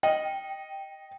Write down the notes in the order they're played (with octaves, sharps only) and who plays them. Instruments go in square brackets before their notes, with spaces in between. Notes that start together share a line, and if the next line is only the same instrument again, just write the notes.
[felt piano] D#5 [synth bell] G5